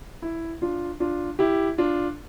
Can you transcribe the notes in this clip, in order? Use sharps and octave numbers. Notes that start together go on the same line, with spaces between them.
E4
D4 F4
D4 F4
E4 G4
D4 F4